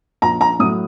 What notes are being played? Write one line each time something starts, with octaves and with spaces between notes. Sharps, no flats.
A#1 A#5
A#5
A2 F#3 D#6